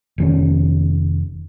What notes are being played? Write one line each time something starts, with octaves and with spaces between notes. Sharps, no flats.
F1 D#3 C#4